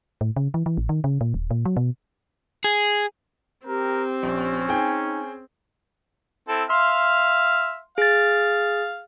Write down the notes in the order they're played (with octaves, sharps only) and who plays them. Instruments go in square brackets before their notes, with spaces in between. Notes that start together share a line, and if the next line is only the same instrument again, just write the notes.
[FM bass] A2
C#3
E3
E3
A1
D#3
C#3
A#2
D#1
A#2
F#3
B2
[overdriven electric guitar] G#4
[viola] C4 [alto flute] G4 [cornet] A#4
[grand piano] A#1 [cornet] C#4
[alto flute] D#4 [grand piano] G#4 G5
[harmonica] C4 E4 A4
[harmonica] E5 F5 F6 [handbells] C6
[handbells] G#4 A6 [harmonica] F5